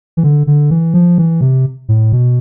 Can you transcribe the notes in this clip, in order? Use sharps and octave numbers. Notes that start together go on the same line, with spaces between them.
E3
D3
D3
E3
F3
E3
C3
A2
B2